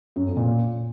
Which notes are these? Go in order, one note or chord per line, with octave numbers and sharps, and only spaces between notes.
F#2
F2
A#2